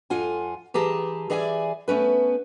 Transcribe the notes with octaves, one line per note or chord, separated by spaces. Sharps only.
F2 F4 F#5 G#5
E3 G4 G#4 A5 A#5
E3 G#4 D5 E5 F5 G#5
A3 B3 C#4 B4